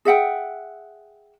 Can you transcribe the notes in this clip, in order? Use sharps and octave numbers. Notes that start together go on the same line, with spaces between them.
G#4 E5 F#5 G5